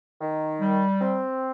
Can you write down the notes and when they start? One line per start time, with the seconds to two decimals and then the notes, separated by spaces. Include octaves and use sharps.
0.20 D#3
0.61 G3
1.00 C4